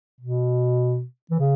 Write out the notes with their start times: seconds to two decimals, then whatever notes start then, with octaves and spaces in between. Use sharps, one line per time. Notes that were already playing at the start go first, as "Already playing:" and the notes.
0.21 B2
1.31 E3
1.39 C#3